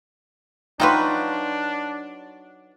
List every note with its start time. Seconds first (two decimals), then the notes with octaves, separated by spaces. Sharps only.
0.80 F#3 D4 D#4 F4 F#4 B4 G5 C6